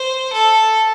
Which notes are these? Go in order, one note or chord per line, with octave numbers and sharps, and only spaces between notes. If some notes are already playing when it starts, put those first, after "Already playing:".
Already playing: C5
A4